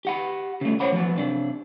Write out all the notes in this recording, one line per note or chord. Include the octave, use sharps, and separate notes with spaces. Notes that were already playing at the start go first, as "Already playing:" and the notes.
G4 F#5 B5
C#3 A3
C5 C#5 F#5 B5
F3 F#3 B3
C3 D4